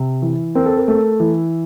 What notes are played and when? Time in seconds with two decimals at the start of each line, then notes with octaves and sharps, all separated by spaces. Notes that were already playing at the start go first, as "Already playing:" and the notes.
Already playing: C3
0.22 E3
0.55 C4 A#4
0.66 A4
0.76 A#4
0.88 A3
1.20 E3